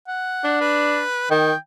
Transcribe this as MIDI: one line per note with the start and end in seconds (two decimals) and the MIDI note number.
0.08 0.60 78
0.44 1.02 62
0.61 1.26 71
1.31 1.52 51
1.31 1.57 79